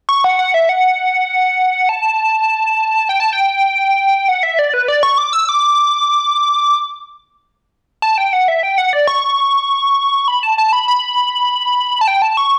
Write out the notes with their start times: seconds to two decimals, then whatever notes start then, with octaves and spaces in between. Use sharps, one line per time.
0.09 C#6
0.24 F#5
0.39 F#5
0.54 E5
0.69 F#5
1.89 A5
3.09 G5
3.20 A5
3.33 G5
4.29 F#5
4.43 E5
4.59 D5
4.74 B4
4.88 D5
5.03 C#6
5.18 D6
5.33 E6
5.49 D6
8.02 A5
8.18 G5
8.33 F#5
8.48 E5
8.63 G5
8.78 F#5
8.93 D5
9.08 C#6
10.28 B5
10.43 A5
10.58 A5
10.73 B5
10.88 B5
12.01 A5
12.08 G5
12.22 A5
12.37 C#6